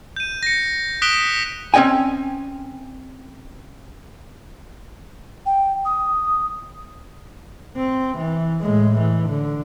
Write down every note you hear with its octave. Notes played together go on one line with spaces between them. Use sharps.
G6 D#7
A#6 C#7
D#6 F#6 B6 D7 E7 G7
C4 C#4 D#5 G5 G#5
G5
D#6
C4
E3
A2 G#3
E3
D3